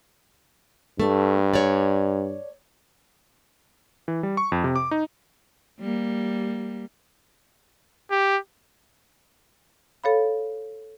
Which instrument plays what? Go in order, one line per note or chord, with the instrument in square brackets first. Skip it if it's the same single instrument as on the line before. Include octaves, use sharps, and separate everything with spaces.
[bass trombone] G2 [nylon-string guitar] A3
[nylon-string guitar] C#5 D5
[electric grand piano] E3
G3
C#6
F2
C3
D6
D#4
[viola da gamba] G3 A#3
[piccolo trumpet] G4
[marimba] A4 C#5 F5 B5